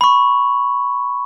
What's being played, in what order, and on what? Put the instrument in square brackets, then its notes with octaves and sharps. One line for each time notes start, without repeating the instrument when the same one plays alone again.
[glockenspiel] B5 C#6